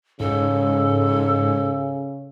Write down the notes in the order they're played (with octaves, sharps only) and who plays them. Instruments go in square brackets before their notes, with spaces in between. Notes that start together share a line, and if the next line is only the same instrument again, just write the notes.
[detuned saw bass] G#2 [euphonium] C#3 [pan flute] A4